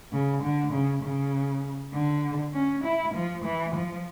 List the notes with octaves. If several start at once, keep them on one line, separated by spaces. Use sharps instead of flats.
C#3
D3
C#3
C#3
D3
C#4
E4
F3
E3
F3